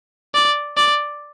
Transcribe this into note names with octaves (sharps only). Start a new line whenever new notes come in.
D5
D5